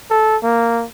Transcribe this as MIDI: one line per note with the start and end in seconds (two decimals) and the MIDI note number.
0.11 0.37 69
0.43 0.85 58